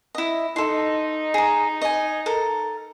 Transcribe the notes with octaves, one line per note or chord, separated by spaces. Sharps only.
E4 D#5
D#4 A4 C6
G#4 A#5
D#5 G#5
A4 A#4